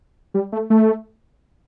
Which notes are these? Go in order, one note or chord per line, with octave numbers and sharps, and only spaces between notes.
G3
A3
A3